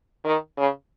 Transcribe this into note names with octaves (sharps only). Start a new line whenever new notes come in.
D#3
C#3